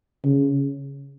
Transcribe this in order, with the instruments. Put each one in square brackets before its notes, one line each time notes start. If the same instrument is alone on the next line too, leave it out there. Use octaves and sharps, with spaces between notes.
[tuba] C#3